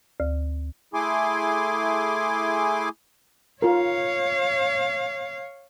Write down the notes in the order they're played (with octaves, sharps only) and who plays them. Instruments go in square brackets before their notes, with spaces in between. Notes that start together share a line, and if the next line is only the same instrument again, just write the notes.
[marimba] D2
[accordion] A3 E4 G#4 G#5 C6 D6
[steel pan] F4 A#4 [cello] C#5 F5